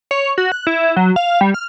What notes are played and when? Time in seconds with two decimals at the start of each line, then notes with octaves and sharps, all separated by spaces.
0.11 C#5
0.38 F#4
0.52 F#6
0.67 E4
0.96 F#3
1.16 F5
1.41 G3
1.54 F6